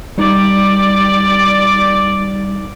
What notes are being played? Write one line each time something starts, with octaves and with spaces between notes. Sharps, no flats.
G3 D#4 D5